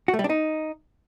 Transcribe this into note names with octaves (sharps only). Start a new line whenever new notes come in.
F#4
A3
G3
D4
D#4